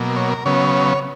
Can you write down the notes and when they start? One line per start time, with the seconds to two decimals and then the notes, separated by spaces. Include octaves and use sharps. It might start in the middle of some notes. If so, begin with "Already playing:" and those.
Already playing: B2 F#3 A#3
0.16 C#5
0.31 A#4
0.45 C#3 F#3 B3 C#5